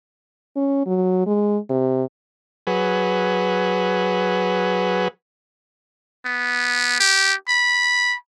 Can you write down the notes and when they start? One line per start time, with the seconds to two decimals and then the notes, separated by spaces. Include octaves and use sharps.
0.56 C#4
0.86 F#3
1.27 G#3
1.70 C3
2.67 F#3 G#4 B4
6.26 B3
7.00 G4
7.48 B5